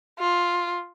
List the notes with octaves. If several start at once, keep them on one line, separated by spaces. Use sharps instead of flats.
F4